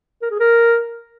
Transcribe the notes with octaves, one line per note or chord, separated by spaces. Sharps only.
A#4
G#4
A#4